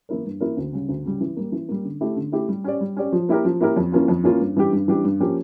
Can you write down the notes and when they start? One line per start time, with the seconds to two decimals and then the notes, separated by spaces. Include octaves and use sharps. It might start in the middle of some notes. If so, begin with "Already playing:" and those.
0.09 E3 A#3 E4 A#4
0.25 G2
0.40 E3 A#3 E4 A#4
0.57 D2
0.73 C#3 G3
0.89 D2
1.05 C#3 G3
1.21 E3
1.37 G3 A#3
1.52 E3
1.69 G3 A#3
1.85 D3
2.01 A3 E4 G4
2.16 D3
2.32 A3 E4 G4
2.49 G3
2.64 C#4 G4 D5
2.81 G3
2.97 C#4 G4 D5
3.12 F3
3.29 A#3 E4 G4 A#4
3.45 F3
3.61 A#3 E4 G4 A#4
3.76 F2
3.92 E3 A#3 C#4 F4
4.08 F2
4.24 E3 A#3 C#4 F4
4.40 G2
4.57 E3 G3 D4 G4
4.72 G2
4.88 E3 G3 D4 G4
5.04 G2
5.20 F3 A#3 C#4 G4